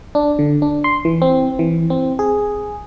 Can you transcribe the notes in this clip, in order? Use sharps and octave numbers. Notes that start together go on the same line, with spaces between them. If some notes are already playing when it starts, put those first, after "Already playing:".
D4
D3
D4
C6
E3
C4
E3
C4
G#4